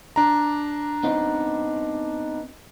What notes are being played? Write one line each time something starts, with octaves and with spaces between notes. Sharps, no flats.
D4 A#5
B3 C4 D#4